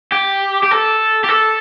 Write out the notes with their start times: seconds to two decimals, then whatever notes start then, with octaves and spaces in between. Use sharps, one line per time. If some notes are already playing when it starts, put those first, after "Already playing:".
0.12 G4
0.63 G4
0.71 A4
1.24 G4
1.29 A4